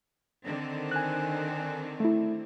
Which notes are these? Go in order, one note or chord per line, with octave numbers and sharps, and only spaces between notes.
D3 D#3 C4
G#5 F#6
A3 E4